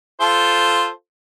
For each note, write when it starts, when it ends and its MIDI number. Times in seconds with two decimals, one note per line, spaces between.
0.21 0.88 65
0.21 0.88 69
0.21 0.88 72